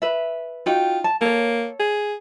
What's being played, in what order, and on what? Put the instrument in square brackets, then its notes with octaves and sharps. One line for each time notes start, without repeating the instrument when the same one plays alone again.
[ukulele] B4 E5
[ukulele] D#4 F#4 G5 [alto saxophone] F4
[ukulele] A5
[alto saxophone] A#3 [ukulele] A4 C#5
[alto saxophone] G#4